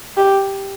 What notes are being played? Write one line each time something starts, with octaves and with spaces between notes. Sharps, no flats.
G4